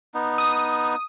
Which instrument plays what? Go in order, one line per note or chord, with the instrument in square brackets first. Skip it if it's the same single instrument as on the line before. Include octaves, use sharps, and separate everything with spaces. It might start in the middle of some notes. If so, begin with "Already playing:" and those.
[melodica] B3 D#4
[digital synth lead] D#6